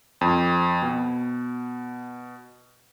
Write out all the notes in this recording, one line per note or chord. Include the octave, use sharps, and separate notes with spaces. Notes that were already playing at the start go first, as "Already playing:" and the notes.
F2
B2